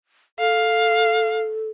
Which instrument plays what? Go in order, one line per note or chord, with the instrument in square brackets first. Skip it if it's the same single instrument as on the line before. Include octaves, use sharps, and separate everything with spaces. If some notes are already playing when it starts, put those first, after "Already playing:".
[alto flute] A4 [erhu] F5